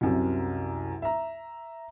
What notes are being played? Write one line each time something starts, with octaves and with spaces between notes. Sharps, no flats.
C2 F#2 C3
E5 A#5